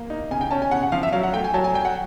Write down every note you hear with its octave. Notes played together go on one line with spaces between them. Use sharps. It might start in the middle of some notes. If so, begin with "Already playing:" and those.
Already playing: A#3
D#4
C#3 G#5
G5
C#4 A5
G#5
C#3 F#5
F#5
F3 F5
E5
F#3 F5
F#5
A3 G5
G#5
F#3 A5
G#5
F#3 G5
F#5